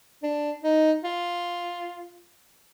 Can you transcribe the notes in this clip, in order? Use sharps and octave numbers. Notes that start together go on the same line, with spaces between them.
D4
D#4
F4